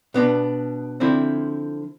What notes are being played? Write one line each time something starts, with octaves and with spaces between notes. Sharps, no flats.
B2 B3 D4
D3 F3 C4 E4